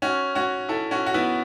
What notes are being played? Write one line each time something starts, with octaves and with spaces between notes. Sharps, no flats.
C#4 F#4
C#4 F#4
E4 A4
C#4 F#4
F#4
B3 E4